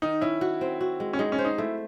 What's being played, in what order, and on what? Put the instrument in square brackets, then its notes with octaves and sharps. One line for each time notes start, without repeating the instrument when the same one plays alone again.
[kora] D#3 [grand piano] D#4
[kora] C#4 [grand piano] E4
[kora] F#4
C4
F#4
G#3
[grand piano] C#4
[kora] G#3 [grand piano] D#4
[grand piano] C#4
[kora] C5
[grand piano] D#4
[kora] A3 [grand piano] E4